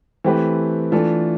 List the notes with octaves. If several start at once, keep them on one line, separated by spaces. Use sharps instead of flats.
E3 A3 C4 G4 B4
E3 A3 D4 F4 A4